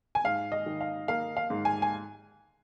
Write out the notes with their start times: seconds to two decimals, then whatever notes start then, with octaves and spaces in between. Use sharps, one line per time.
0.15 G#5
0.24 G#2 F5
0.52 D#5
0.66 D#3
0.81 F5
1.08 A#3 F5
1.37 F5
1.50 G#2
1.65 G#5
1.82 G#5